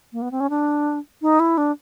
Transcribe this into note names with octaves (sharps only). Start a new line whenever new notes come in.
A#3
B3
C4
C#4
D4
D#4
E4
D4